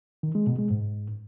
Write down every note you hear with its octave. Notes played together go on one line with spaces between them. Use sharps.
D#3
G#3
B2
G#3
G#2